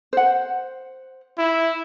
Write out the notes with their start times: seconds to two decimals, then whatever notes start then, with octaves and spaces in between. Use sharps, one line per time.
0.13 C5 F#5
1.38 E4